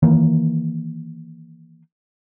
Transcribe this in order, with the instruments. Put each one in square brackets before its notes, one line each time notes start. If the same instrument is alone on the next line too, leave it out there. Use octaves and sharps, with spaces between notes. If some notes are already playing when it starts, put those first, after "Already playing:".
[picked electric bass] D#3 E3 A#3